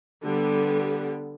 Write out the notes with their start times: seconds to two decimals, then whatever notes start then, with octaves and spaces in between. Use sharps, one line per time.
0.22 D3 G3 B3